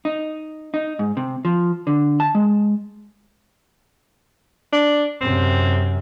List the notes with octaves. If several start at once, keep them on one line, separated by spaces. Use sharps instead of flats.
D#4
D#4
G#2
C3
F3
D3
A5
G#3
D4
F#2 C3 C4